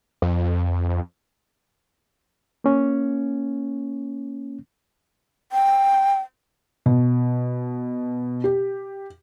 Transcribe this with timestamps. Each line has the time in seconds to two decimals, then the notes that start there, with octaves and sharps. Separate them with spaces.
0.22 F2
2.64 A#3 C#4
5.52 G5
6.86 B2
8.44 G4